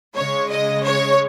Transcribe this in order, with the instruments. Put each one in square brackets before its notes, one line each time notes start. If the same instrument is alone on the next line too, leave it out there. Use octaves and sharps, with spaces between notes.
[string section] C#3 G#3 C#5
D#5
C#5